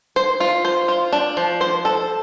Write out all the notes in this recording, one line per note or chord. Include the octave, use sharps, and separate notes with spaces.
C5
F4
C5
F4
D4
F3
C5
A4